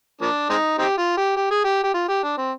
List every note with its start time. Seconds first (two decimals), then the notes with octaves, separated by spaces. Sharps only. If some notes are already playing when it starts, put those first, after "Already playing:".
0.21 F3 A#3 D4
0.50 G#3 C4 D#4
0.79 C4 D#4 G4
0.98 F4
1.17 G4
1.36 G4
1.51 G#4
1.64 G4
1.83 G4
1.94 F4
2.09 G4
2.23 D4
2.37 C4